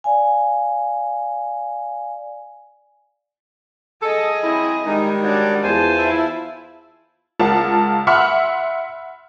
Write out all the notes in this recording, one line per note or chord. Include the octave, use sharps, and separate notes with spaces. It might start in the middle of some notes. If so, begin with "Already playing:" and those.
D5 F5 G#5
G#4 A4 D#5
F#3 C4 E4
D#3 G3 G#3 D#4
D4 F#4 C#5 D5
E2 F4 C5 G#5 A5
E4
C#2 F4 A#4 F#5 A5
E5 F#5 B5 C6 E6 F6